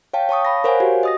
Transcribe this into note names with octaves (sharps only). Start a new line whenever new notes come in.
C#5 F5 G5 A5
C#5 A5 C#6 D#6
F5 B5 A#6
A#4 C5 C#5 F5 F#5 G#5
F#4 G4
D#5 D#6 A#6